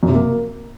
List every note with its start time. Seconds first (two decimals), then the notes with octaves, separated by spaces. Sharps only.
0.03 F#2
0.09 C3
0.14 A#3